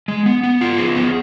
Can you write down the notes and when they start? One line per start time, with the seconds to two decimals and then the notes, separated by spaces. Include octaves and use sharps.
0.08 G#3
0.26 B3
0.43 B3
0.61 F4
0.78 G#4
0.96 B3